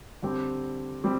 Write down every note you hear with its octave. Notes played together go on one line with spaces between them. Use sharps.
D3 G3 C4 G4
G3 C4 G4